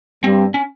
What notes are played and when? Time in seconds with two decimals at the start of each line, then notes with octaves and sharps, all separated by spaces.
0.24 G2 C4
0.54 C#4